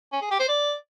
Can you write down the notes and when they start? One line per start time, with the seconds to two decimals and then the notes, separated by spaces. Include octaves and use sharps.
0.13 C#4
0.22 G#4
0.31 G4
0.39 C5
0.48 D5